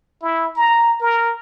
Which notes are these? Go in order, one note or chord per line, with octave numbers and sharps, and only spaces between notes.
E4
A#5
A#4